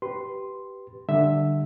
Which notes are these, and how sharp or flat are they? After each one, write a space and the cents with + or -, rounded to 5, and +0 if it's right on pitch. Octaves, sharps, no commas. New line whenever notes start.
G4 -15 B4 +0 C6 +0
D3 +20 G3 +0 E5 +0